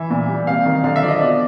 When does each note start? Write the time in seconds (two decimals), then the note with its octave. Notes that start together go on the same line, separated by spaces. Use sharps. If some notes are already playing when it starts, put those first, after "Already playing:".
Already playing: E3 E5
0.10 A#2
0.29 G3
0.47 C3 F5
0.65 D#3
0.84 D3 F5
0.96 E5
1.02 F3 D5
1.09 D#5
1.21 B2 D5